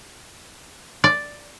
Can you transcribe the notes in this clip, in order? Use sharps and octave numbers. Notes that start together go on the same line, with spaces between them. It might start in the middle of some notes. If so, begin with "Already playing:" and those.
D5